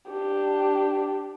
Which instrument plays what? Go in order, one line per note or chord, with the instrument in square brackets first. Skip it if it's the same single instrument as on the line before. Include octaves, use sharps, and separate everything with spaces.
[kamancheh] D4 G4